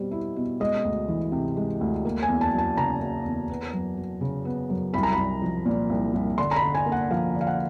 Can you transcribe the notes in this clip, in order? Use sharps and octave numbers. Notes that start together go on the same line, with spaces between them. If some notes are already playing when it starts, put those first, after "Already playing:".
Already playing: B2 G3 C4
E4
B2
G#3 D#5
D2
E3
C3
G#3
D2
A#3
G#5
E2
A5
F#3
A5
C#3 A#5
A#3
E2
B3
F#2
F#3
C#3
B3
F#2
C2 B5
A#5
C2 B5
F3
A#2
C2
C2
D3 C6
A#5
B5
D3
G#5
A#3
F#5
F3 F5
D3
F5
F#5